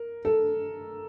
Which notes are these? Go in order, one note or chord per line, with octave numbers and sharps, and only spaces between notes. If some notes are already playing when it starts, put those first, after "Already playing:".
Already playing: A#4
A4